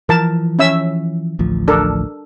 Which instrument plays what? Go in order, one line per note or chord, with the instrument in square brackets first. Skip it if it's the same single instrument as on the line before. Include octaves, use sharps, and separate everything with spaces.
[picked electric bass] E3 F3 [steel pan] A#4 A5
[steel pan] C#4 E5 E6
[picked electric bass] A1 D2 F3
[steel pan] D4 A4 A#4